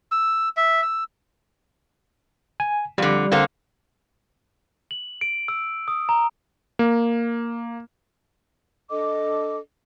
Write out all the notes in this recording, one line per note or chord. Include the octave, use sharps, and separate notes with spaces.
E6
E5
E6
G#5
F2 D3 G3
D3 A#3 C4
F#7
D7
E6
D#6
A#5
A#3
D4 A4 D#5 D6